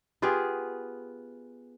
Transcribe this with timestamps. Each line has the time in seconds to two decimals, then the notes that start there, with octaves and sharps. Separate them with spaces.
0.22 B3 F4 G4 G#4